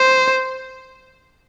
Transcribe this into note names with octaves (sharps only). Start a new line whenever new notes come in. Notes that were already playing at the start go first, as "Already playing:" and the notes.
Already playing: C5